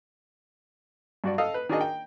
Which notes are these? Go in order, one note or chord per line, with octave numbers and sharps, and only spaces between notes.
G2 F#4 D5
A4 D#5 F5 D#6 E6
B4
D#3 D4 F#4 G#4 D#5
G5